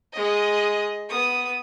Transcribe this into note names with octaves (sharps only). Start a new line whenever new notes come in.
G#3 D#5
B3 D#6